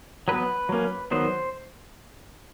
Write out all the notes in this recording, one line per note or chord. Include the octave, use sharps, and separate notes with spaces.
F#3 B3 B4
F#3 A#3 C#4
D#3 F#3 B3 C5